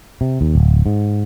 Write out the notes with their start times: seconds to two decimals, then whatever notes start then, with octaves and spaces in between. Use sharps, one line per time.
0.21 C3
0.41 D#2
0.55 D1
0.86 G#2